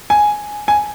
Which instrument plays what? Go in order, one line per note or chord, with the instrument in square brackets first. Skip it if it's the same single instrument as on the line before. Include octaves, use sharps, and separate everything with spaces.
[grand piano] G#5
G#5